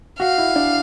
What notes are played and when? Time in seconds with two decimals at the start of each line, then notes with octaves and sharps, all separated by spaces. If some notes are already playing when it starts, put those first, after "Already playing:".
0.19 F#4 F5
0.38 E4
0.56 D4